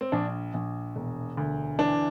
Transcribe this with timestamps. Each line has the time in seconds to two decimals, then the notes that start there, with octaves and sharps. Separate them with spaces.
0.01 C4
0.12 A#1 D4
0.54 A#1
0.96 E1
1.37 D2
1.78 E3 D4